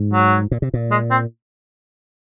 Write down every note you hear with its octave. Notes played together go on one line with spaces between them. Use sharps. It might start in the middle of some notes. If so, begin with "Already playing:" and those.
Already playing: G#2
F#3
A#2
C3
A#2
G#3
C4